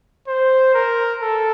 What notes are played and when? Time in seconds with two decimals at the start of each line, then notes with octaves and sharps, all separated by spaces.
0.28 C5
0.75 A#4
1.22 A4